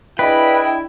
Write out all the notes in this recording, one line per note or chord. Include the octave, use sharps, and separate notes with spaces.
D4 E4 G#4 B4 D5 D#5 G5